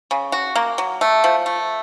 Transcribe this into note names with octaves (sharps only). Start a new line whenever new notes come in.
C#3
F#4
A#3
F#3
A3
F3
A3